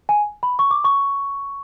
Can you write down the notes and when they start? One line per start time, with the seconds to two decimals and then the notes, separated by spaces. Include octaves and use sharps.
0.09 G#5
0.43 B5
0.59 C#6
0.71 D6
0.84 C#6